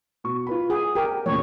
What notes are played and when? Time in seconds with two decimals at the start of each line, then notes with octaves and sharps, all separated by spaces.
0.24 B2 C#6
0.47 F4 B4 B5
0.70 G#4 F#5
0.95 G4 A#4
1.26 E2 A#2 C#3 C#5